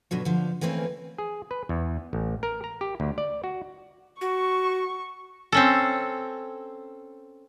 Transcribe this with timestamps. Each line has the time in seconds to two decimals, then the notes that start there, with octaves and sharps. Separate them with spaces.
0.11 G2 B2 D3 F#3
0.25 D3 F3
0.61 E3 A3 A#3 C4 C#4
1.18 G#4
1.51 B4
1.69 E2
2.13 A1
2.43 A#4
2.64 A#5
2.81 G4
3.00 D2
3.18 D5
3.44 F#4
4.21 F#4 C#6
5.52 C4 C#4 A4